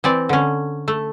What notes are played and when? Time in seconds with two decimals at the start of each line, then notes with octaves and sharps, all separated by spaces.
0.04 E3 C4 D5
0.29 D3 C#4
0.88 A3